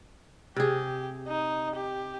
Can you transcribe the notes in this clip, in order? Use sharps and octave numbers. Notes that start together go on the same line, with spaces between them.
C3 G4 G#4
D#4
G4